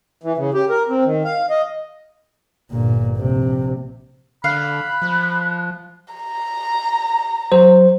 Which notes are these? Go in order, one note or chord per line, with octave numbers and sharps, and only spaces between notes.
E3
C#3
G4
A#4
C4
D#3
F5
D#5
G1 A#2
A#1 C3
D3 F5 B5 F#6
F3
A#5
F#3 C5